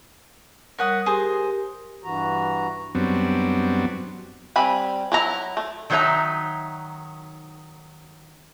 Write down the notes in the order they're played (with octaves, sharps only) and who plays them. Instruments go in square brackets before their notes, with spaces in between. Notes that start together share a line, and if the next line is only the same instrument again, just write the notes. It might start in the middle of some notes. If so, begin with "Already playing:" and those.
[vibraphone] G3 A#4 [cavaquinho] C#5 F#5 D#6
[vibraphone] G4 A#4 [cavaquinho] G#4 C5
[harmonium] G2 E3 F#4 A#5
[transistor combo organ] F#2 F#3 G3 B3 C4 D4
[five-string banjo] G3 C4 G#5 B5
F#3 E4 A#5
A3
[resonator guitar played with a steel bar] D#3 F#3 D#4 B4 E5 A#5